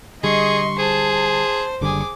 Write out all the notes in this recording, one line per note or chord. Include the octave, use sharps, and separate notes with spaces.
D3 G3 G#4 D#5 C6 C#6
G#4 C5 A5
F#1 D3 G3 G#4 D6